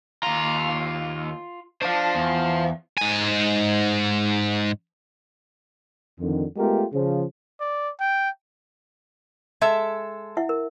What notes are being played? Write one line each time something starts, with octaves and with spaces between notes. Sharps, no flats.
D#2 F4 A#5
D4 C5 F5
E2
G#2 G#5
F2 D3 D#3
G#3 A3 B3 F4 G4 A#4
C#3 F3
D5
G5
G#3 A4 E5
E4 E5 F#5
A#4